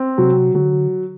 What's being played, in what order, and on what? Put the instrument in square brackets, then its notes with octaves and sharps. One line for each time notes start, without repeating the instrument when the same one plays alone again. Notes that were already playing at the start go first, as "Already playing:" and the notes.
Already playing: [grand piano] C4
[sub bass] C3 [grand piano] F#3
[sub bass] D3 [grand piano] F#3